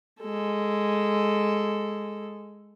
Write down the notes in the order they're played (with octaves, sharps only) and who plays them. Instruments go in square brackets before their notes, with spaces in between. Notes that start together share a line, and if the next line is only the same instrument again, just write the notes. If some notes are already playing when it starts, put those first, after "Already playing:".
[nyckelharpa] G#3 A4